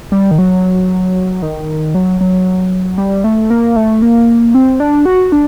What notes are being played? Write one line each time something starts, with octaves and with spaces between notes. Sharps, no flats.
G3
D#3
F#3
D#3
F#3
F#3
G3
A3
A#3
A3
A#3
C4
D4
F#4
D4